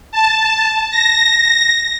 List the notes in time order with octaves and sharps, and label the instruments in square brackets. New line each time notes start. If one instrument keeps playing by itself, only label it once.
[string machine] A5
A#6